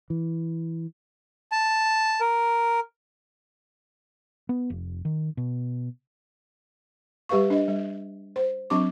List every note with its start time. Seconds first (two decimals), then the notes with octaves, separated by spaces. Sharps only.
0.10 E3
1.52 A5
2.21 A#4
4.49 B3
4.70 F1
5.05 D#3
5.37 B2
7.29 G3 G4 B4 F5 C#6
7.50 D4 D#5
7.68 G3
8.36 C5
8.70 F#3 C4 D4 C#6 D6